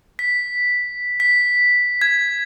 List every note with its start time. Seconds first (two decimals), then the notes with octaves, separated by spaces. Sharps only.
0.19 B6
1.20 B6
2.01 G#6